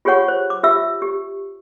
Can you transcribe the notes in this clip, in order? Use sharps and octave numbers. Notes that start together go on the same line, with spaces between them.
F4 G4 G#4 C#5 F#5 C#6
C5
D6
F4 G4 E5 E6
G4